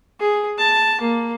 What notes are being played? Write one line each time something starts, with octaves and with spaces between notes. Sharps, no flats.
G#4
A5
A#3